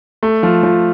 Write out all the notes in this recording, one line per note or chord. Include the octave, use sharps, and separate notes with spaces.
A3
F3
F3